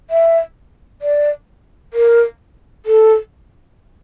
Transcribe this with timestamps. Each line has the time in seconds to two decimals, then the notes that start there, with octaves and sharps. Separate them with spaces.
0.10 E5
1.02 D5
1.93 A#4
2.86 A4